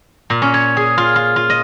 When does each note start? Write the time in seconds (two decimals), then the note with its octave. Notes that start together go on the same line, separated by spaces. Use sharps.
0.30 A#2
0.42 C#4
0.54 C#5
0.77 G#4
0.98 F4
1.16 F4
1.36 F4
1.50 D#5